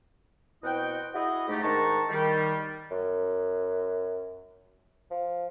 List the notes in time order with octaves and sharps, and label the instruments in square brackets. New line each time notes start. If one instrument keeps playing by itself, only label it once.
[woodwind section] B2 C4 E4 F#4 D#5 G5
E4 F#4 G#4 D#5
G#2 A3 G4
G#2 D#3 D4 A5 A#5 C#6
D#3 G3
[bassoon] F#2
F3